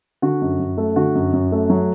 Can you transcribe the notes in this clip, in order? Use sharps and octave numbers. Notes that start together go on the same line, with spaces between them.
D3 F#4
F#2
F#2
A3
D3 F#4
F#2
F#2
A3
F#3